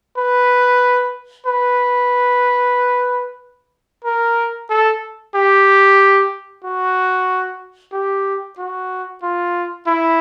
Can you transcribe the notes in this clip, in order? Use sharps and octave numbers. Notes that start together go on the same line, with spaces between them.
B4
B4
A#4
A4
G4
F#4
G4
F#4
F4
E4